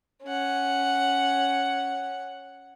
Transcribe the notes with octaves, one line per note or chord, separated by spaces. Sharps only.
C#4 F#5